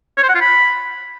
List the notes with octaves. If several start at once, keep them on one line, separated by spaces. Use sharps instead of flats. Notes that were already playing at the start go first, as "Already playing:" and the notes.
C#5
C5
F#5
F4
B5